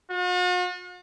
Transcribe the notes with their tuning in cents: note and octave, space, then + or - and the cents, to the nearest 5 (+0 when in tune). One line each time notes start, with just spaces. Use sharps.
F#4 -45